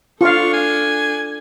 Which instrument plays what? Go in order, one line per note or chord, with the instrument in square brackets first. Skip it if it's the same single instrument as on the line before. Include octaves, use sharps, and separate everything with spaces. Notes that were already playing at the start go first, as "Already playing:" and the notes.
[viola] D4 A4 [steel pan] F4 F5 [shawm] C#6
[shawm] G#5